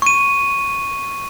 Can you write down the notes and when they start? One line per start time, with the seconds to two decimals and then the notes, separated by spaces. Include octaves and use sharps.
0.02 C#6 D#7